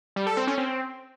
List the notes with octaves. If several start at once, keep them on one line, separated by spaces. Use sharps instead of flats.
G3
A4
C4
C#4
C4